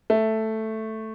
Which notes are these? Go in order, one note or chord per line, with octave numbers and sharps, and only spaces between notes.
A3